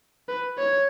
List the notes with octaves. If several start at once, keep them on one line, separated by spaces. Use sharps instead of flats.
B4
C#5